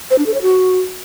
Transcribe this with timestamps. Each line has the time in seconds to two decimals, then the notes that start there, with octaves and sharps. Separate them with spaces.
0.11 C5
0.18 D4
0.26 A4
0.34 C#5
0.42 F#4